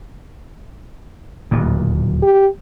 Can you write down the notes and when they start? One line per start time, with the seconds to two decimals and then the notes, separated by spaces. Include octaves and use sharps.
1.51 D1 D#2 A#2
2.22 G4